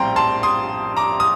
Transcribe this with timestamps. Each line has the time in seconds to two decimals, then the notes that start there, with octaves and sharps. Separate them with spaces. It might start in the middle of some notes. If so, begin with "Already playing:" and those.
Already playing: A#1 A2 G3 C4 G5 A#5 C6
0.16 A5 C6
0.43 C6 D#6
0.97 A#5 D6
1.20 D#6